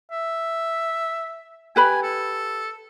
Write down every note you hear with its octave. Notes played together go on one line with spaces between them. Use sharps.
E5
G4 B4 G#5 B5
A4